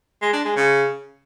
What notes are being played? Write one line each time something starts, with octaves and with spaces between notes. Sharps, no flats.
G#3
D4
G#3
C#3